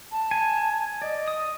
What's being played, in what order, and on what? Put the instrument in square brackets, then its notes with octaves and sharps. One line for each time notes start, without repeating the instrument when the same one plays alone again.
[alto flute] A5
[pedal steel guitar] G#5
[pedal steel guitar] D5 [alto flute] D#5
[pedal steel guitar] D#6